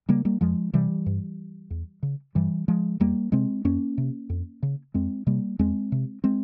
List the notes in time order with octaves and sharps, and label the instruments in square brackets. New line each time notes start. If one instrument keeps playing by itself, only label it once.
[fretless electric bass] C#3 G3 A#3
G3 A#3
F2 F3 G#3
C3 E3 G3
G2
E2
C#3
G2 E3 G3
F3 G#3
E2 G3 A#3
C3 G#3 C4
F2 A#3 C#4
C3
F2
C#3
F2 G#3 C4
C3 G3 A#3
E2 G#3 C4
C3
G#3 C4